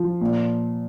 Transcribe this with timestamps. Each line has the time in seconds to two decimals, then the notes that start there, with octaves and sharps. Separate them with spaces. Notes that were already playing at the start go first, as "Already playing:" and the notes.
Already playing: F3
0.21 A#2